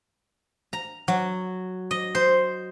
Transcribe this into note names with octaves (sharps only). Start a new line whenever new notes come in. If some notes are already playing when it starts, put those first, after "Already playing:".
A#5
F#3
D#5
C5